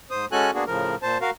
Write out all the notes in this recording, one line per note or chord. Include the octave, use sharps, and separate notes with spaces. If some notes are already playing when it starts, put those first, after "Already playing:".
G#2 C5 D#6
G#3 C#4 F#4 A4 G#5 F#6
A#3 B3 D4 F#4 G#4
A2 C#3 F3 A#4
A#2 C5 A5
F#4 A#4 F5